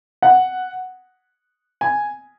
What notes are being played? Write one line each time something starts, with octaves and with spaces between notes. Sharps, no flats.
F#5
G#5